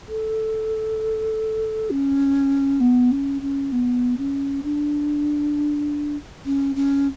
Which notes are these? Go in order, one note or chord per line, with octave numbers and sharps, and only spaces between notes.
A4
C#4
B3
C#4
C#4
B3
C#4
D4
C#4
C#4